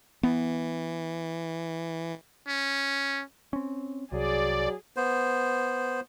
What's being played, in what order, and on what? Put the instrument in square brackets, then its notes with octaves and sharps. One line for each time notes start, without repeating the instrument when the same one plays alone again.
[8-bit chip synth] E3 [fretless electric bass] B3
[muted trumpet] C#4
[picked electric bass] C4 C#4
[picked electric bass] C2 [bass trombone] F#3 [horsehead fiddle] G#4 [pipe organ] D5
[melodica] B3 C5